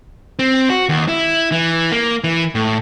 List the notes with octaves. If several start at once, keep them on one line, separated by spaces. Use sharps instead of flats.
C4
F#4
D#2
E4
E3
A#3
E3
A2